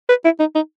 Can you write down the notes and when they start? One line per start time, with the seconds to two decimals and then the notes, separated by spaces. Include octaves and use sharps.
0.09 B4
0.25 E4
0.40 D#4
0.56 D#4